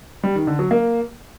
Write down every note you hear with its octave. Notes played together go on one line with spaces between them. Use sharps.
G3
D#3
D3
F#3
A#3